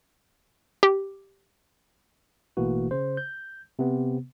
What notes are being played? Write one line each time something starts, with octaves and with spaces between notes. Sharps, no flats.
G4
A1 B2 E3 A3 A#3 F#4
C#3 C5
G6
C3 B3